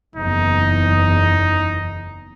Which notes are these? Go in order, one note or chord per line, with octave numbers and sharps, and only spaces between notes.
F#1 E2 D#4